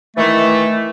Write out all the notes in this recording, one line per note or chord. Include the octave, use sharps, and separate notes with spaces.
D#3 E3 A3